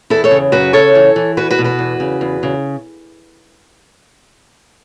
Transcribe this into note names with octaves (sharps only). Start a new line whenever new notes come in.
E2 E4 A4
A4 C#5
C#3
F#2 F#4 B4
C#3 A4 C#5
E3
E3
E2 F#4 B4
F#4 B4
B2
F#4 B4
E2
C#3
E2
C#3